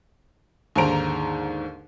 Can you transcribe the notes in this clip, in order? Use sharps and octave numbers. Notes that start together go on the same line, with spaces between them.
D#2 G#2 D3 C5 A#5 D7